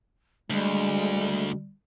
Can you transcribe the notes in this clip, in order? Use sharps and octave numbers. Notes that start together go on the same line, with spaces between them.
D2 G3 G#3